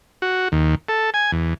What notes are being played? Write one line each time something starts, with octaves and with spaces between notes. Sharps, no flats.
F#4
D#2
A4
G#5
E2